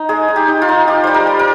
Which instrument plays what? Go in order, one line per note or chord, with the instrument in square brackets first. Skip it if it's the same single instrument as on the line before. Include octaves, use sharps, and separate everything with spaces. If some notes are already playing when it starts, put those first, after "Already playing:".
Already playing: [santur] D#4
G#3 G#4
D#4
G4
D#4
F4
D#4
F4 G4
G3 C5
A#4
G3
A#4